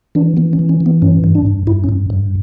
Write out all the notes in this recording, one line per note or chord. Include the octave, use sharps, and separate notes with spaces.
E3 D4
E3 B3
C#4
E3
C#4
E3
B3
G2 C#4
G2
D4
G2
G2 E4
C#4
G2
G2